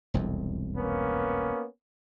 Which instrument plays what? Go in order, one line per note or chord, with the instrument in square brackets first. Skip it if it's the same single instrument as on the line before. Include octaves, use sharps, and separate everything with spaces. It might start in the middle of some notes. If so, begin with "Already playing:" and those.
[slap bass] E1 C2 F2
[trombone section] A#3 B3 C#4